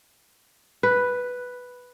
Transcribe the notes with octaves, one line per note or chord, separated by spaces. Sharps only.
B4